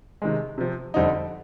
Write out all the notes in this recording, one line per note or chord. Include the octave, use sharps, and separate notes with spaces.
C3 D#3 G#3
C3 F3 C4
F2 D3 G3 C4 D#4